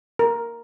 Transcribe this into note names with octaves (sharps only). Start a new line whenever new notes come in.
A#4